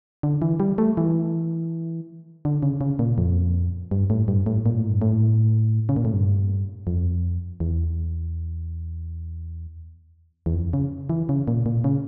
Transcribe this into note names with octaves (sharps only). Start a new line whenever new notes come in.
D3
E3
G3
A3
E3
D3
C#3
C#3
A#2
F2
G2
A2
G2
A2
A#2
A2
G2
A2
C#3
A#2
A2
G2
F2
E2
E2
F2
C#3
E3
C#3
A#2
A#2
C#3